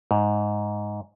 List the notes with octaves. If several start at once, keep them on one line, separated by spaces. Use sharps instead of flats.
G#2